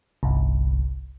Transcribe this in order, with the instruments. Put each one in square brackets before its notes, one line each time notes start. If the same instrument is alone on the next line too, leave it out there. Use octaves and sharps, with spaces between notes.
[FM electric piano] G1 C2